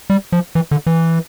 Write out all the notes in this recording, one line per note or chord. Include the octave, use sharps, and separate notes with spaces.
G3
F3
E3
D3
E3